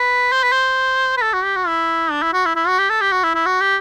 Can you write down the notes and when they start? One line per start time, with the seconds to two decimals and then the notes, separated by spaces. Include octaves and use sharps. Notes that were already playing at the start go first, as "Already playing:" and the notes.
Already playing: B4
0.32 C5
0.43 B4
0.53 C5
1.17 B4
1.22 A4
1.33 F#4
1.44 G4
1.56 F#4
1.67 E4
2.11 D4
2.22 E4
2.33 F#4
2.46 E4
2.56 E4
2.67 F#4
2.79 G4
2.90 A4
3.01 G4
3.12 F#4
3.24 E4
3.35 E4
3.46 F#4
3.61 G4